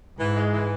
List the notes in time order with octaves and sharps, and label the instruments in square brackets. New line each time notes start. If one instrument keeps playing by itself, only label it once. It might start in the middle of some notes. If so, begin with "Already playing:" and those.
[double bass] G#2 [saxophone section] E3
[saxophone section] G#3
E3